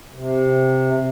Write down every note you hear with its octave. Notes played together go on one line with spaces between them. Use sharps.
C3